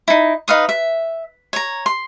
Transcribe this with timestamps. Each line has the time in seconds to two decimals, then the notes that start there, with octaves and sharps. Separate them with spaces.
0.08 D#4 E4
0.48 D#4 B4 F5 D#6
0.69 E5
1.53 C#5 A#5
1.86 C6